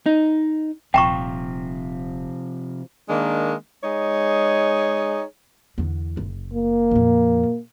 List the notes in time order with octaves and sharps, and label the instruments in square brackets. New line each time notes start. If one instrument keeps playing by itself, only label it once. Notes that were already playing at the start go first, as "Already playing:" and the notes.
[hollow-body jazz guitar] D#4
[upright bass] D#1 [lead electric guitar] C3 F3 [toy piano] G5 A#5 C#6
[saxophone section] D#3 G#3 A#3 D4
G#3 D#4 G#4 C#5
[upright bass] E2 D3
F#1
[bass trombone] A#3
[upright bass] F2 A#2